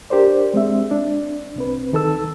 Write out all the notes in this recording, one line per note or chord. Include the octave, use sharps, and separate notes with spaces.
D4 G4 A#4 C5 D5
G#3 C4 E5
D4
C2 C4 B4
C#2 D#3 A4 A5 E6